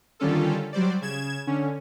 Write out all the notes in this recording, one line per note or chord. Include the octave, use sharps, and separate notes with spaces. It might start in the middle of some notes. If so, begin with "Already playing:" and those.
D3 D#3 G3 C#4 F4 A4
F#3 G3 C5 D5
C#3 G#6 E7
D3 C#4